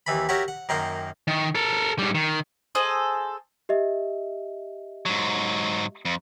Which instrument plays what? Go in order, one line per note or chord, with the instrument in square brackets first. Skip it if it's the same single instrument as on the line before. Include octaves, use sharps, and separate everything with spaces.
[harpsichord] D#2 E3 B5
F#4 G4 A#4 C#5 E5 F#5
F#5
F#2 D#3 A#3 F#5 G5 C6
[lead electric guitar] D#3
A4 A#4
G#2 G3
D#3
[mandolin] G#4 A4 C5 D#5
[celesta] G4 D#5 E5
[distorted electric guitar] G#2 F#3
F2